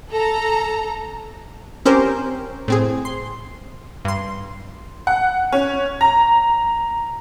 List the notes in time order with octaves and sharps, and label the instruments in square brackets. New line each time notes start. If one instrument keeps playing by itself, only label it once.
[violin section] A4 A#5
[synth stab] C4 C#4 G4 A#4 C5
A2 C4 G#4
C6
G2 C6
[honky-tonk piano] F#5
C#4
A#5